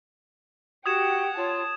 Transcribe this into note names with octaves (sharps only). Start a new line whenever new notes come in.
F#4 G4 F#5 G5 D#6 G#6 E7
F4 C#5 A5